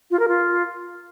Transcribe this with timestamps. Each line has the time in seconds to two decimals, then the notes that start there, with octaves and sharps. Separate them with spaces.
0.11 F4
0.19 A#4
0.28 F4